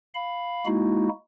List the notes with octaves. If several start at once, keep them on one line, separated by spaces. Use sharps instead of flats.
F5 B5
G#3 A#3 D#4 E4 F#4